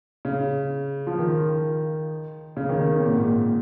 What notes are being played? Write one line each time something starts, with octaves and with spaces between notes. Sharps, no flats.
C#3
F3
D#3
C#3
D#3
C#3
C3
A#2
G#2
A#2